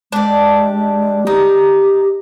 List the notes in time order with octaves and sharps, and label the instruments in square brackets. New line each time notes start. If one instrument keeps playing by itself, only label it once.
[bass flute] G#3 [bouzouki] D4 G4
[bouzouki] D#4 [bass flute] G4